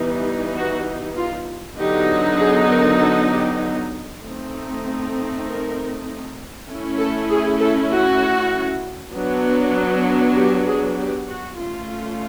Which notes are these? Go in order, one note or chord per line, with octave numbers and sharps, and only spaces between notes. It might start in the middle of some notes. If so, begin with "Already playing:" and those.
Already playing: E3 G3 B3 D#4
F#4
F4
D3 F#3 B3 D#4 G4
G#4
A#4
A4
G4
A3 C4 D#4
A#4
A3 C#4 E4
A4
G#4
A4
F#4
F#3 B3 D4
G4
G#4
G4
F#4
A3 C#4 F4